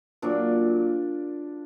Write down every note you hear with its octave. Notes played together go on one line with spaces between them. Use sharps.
A#2 F#3 D4